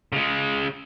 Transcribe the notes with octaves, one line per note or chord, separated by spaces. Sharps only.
C#3 G#3